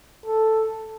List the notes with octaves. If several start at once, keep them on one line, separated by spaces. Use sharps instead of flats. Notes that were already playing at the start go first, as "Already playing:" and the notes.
A4